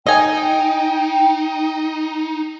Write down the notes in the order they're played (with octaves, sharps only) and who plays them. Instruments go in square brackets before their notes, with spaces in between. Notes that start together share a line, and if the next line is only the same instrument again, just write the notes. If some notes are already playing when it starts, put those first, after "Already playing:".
[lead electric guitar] D#4 [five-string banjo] D#5 G#5 [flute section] G5